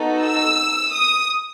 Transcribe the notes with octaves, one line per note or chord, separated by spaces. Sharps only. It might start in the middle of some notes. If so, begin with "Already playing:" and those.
Already playing: B3 D#4 F#4 A4
E6
D#6